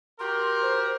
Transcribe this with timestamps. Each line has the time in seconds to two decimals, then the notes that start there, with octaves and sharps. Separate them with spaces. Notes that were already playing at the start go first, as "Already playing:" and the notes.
0.19 F#4 G4 A#4 C6
0.62 C5